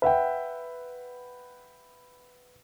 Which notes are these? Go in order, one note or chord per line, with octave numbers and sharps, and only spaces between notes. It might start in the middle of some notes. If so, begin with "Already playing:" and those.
B4 E5 F#5 G5